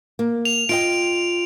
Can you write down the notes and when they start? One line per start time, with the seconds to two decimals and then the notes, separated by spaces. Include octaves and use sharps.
0.19 A#3
0.45 F7
0.69 F4 D#5 G5 D7